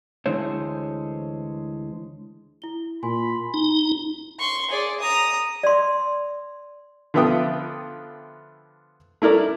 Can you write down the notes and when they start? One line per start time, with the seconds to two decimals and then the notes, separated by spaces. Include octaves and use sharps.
0.26 D2 D3 E3 G#3 C5 C#5
2.62 E4 G7
3.03 A#2 G#5 B5 C6
3.54 D#4
4.39 C6 C#6
4.71 G#4 D5
5.00 A#5 D#6
5.63 D5 C6
7.14 D3 F3 B3 E5 G5 D#6
9.22 A3 E4 A#4 D5